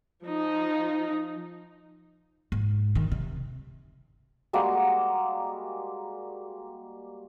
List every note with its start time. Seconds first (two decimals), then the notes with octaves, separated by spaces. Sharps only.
0.24 F3 D#4
2.52 G#2
2.95 D#3
3.12 C3
4.53 G3 G#3 A#3 F#4